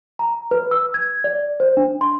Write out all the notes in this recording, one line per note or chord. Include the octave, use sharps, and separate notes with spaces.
A#5
B4
E6
G#6
D5
C5
D4
C6